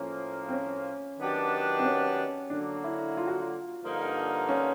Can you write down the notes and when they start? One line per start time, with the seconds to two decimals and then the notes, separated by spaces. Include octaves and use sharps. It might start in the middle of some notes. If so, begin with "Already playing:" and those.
Already playing: A2 F3 A#3 C#4
0.49 C4
0.53 C#4
1.18 D#3 F#3 B3 D4 G4
1.80 C4
1.85 C#4
2.50 D3 F#3 A#3 D4
2.84 E4
3.17 F4
3.28 F#4
3.40 F4
3.83 G2 D3 F3 A#3 D#4
4.49 C#4